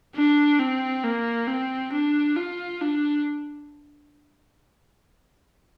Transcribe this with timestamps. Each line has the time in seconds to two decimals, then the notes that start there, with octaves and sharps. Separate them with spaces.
0.15 D4
0.59 C4
1.04 A#3
1.47 C4
1.93 D4
2.36 F4
2.81 D4